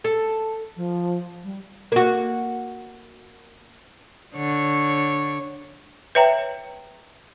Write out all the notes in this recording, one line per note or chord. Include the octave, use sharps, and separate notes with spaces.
A4
F3
G3
A#3 F#4
D3 C#5
B4 C#5 E5 G5 A#5